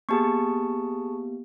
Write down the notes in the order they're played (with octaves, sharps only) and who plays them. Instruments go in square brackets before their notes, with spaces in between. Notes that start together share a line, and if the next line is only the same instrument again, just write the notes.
[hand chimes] A#3 B3 G4 [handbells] G#4 A5 C#6